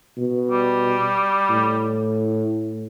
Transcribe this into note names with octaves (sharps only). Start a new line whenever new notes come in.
B2
G3
A2